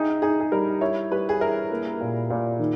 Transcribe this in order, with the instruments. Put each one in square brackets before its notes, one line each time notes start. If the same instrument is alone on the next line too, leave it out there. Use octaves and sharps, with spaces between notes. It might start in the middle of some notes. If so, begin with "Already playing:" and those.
Already playing: [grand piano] D#4 [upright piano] E4 G4 G#4
[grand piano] D#4 [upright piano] G#4
[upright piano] G#4
[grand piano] G3 [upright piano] A#4
[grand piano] E4 [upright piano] C#5
[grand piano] G3 [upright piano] B4
[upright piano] G#4
[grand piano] E4 [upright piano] A#4
[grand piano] A#3
A#2
A#2
D#3